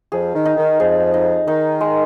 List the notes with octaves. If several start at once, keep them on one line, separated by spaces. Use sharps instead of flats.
F2 F3 G#4
D#3
D#4
D#3
F2 F3 G#4
D#4
D#3 D#4
G#3